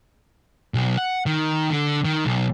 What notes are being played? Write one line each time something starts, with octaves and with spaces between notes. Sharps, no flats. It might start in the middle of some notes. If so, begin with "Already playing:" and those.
B1
F#5
D#3
D3
D#3
B1